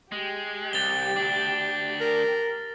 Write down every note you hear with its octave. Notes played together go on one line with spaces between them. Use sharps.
G#3 G4
C2 A6 G7
D2 D4
A#4